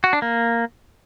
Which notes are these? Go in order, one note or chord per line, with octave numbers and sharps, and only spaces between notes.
F#4
D4
A#3